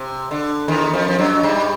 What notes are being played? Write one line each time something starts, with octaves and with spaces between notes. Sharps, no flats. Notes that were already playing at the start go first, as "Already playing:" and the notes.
Already playing: C3
D3
D#2 D#3
F2 F3
F3
F#2 F#3
G2 G3